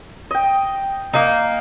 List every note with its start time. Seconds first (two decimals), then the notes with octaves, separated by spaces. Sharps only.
0.31 D#5 G5
1.13 A#3 D#4